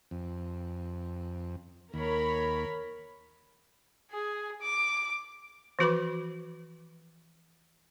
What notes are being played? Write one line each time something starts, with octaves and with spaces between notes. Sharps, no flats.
F2
D#2 A#4 C#5 B5
G#4
D6
E3 F3 F#4 B4 B5 D6